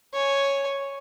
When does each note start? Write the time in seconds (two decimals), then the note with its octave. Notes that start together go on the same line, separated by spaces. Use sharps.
0.13 C#5 G#5